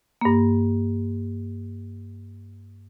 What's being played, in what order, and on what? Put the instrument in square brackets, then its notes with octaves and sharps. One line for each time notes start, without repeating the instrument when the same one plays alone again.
[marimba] G2 A#3